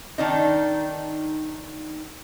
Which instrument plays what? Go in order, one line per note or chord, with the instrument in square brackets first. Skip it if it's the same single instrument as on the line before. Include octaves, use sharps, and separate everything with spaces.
[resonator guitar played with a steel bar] D#3 D4 D#4